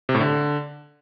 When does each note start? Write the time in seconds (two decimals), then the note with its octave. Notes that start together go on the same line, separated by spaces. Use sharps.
0.09 C3
0.15 A2
0.20 D3